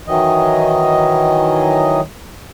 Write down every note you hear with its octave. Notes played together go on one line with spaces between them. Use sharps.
D#3 E3 F#3 D#5